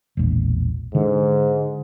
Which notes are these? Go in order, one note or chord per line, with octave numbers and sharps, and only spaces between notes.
E1 A#1
G#2 D3